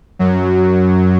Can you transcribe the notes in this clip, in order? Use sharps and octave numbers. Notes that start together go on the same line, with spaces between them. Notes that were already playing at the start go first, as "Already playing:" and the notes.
F#2 F#3